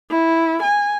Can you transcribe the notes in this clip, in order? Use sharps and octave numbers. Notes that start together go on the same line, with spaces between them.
E4
G#5